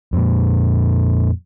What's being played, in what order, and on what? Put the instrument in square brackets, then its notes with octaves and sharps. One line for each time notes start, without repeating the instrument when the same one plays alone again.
[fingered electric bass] F2 A#2